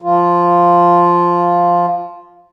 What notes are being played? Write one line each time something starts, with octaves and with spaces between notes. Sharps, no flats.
F3 F4